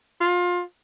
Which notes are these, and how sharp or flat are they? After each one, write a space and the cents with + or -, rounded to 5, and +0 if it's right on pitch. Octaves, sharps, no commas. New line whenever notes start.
F4 +25